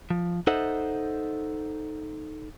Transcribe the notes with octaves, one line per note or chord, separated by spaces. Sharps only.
F3
D#4 A4 C5 D#5 E5 F#5